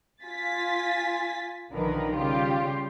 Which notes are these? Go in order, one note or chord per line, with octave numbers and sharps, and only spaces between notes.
F4 G#5 A6 B6
B1 D3 D#3 F3 A#4 B4
C#3 G3 F4 G4